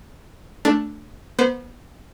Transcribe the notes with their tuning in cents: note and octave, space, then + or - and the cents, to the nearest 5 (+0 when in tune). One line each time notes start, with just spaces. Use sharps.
A3 +0 D4 +0 A5 +0
B3 -25 C5 -30